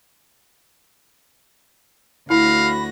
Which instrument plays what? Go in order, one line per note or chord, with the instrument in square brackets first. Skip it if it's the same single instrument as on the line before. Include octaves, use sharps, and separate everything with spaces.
[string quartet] D2 F#4 A#6 [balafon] E4 [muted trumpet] F5 [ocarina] B5